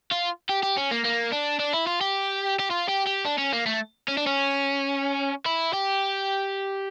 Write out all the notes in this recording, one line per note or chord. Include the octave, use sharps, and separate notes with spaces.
F4
G4
G4
C#4
A#3
A#3
D4
D4
E4
F4
G4
G4
F4
G4
G4
D4
C#4
A#3
A3
C#4
D4
C#4
E4
G4